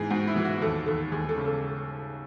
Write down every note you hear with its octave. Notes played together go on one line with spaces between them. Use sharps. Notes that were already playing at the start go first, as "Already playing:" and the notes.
Already playing: G#2 E3 G#4
G#2 F#4
E4
E3
F#4
D#2 A4
D#2 A4
D#2 G#4
A4
C#3
A4